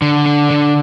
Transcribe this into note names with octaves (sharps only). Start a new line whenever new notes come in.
D3
D4
D3